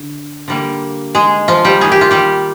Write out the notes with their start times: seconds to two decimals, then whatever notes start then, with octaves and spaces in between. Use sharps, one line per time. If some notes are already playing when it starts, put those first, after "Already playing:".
Already playing: D3
0.48 D3 G3 A#3
1.15 G#3 G#4
1.48 F3 F4
1.65 G3 G4
1.81 D#3 A#3 G#4
1.92 G4
2.01 F4
2.11 G3 G4